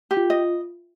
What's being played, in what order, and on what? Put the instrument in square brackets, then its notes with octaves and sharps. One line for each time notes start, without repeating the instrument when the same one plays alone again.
[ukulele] G4
[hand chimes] F4
[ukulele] D#5